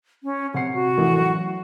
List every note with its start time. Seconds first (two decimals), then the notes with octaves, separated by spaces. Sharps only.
0.23 C#4
0.54 C3 F#5 C7
0.74 F#4
0.98 A1 E3
1.18 F#3